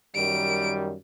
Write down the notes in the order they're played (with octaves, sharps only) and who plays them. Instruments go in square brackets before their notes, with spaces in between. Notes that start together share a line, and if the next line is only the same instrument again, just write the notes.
[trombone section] F#2 D#3 G3 [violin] D7